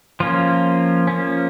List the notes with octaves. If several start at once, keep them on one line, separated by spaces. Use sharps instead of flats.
F3 A#3 C#4 F4
F3 A#3 C#4